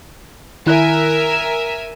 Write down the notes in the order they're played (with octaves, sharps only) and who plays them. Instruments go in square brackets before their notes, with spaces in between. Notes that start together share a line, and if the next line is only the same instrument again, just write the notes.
[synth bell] D#3 E4 F#6 [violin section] A#4 E5 G#5
[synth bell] E7